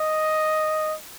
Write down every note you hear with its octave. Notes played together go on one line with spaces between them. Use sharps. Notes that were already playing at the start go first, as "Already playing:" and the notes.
Already playing: D#5